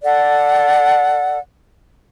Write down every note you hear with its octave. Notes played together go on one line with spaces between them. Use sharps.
A4 D5 F#5